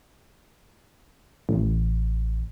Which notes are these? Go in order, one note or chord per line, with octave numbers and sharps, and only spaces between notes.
A1